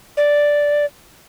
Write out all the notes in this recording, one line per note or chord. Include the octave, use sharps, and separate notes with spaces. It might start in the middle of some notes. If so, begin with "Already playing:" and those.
D5